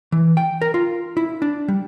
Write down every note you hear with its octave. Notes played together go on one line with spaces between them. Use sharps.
E3
G5
A#4
F4
E4
D4
G3